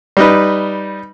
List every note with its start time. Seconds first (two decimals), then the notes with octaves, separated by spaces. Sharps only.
0.17 G3 D#4 B4